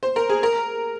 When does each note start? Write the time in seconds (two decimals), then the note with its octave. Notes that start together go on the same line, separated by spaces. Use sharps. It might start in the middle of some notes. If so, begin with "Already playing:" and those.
0.03 C5
0.16 A#4
0.29 G#4
0.43 A#4